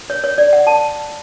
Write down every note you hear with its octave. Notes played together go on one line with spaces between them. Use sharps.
C#5
C#5
D5
F#5
A5